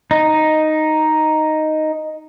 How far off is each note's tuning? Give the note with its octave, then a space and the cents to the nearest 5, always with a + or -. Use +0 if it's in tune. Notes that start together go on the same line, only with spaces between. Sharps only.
D#4 +0